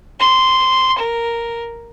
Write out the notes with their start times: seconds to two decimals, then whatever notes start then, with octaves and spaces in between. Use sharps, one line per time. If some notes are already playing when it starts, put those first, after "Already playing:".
0.20 C6
0.98 A#4